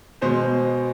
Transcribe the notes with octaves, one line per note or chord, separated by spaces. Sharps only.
B2 G#3 C5